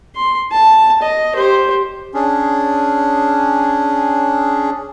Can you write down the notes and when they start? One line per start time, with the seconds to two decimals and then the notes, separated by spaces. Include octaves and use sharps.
0.16 C6
0.51 A5
1.02 D#5
1.35 G4 C5
2.14 C#4 D4 G#4